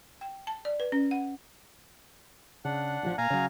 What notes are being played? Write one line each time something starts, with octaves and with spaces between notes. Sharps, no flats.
G5
A5
D5
B4
C#4
F#5
C#3 D4 F#5
A1 E3 F3
A#2 F5 G#5 A#5
C#3 F#3